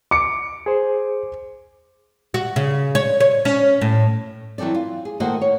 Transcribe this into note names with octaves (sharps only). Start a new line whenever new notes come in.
D6 C#7
G#4 C5
F#4
C#3
C#5
C#5
C#4
A2
E3 F#3 C4 A4 D5
F4
G#4
D#3 A#3 F#4 A4 C5 D#5
C#5